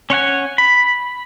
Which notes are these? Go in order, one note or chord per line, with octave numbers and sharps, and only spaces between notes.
C#4 C#5 F#5 G#5
B5